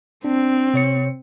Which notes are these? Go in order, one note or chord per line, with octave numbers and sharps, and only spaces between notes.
C4 D4
C3 C#5 C#7